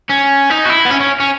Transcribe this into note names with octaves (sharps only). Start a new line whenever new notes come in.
C#4
D#4
F#4
E4
B3
C#4
C#4
C#4